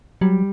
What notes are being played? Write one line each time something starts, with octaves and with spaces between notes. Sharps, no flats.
F#3 G3